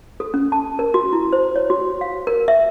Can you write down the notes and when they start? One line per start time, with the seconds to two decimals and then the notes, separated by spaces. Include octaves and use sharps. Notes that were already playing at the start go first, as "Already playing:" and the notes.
0.20 A4
0.34 C#4
0.52 A5
0.79 A#4
0.94 F#4
1.13 E4
1.33 C5
1.56 C#5
1.70 F#4
2.01 F5
2.27 A#4
2.48 E5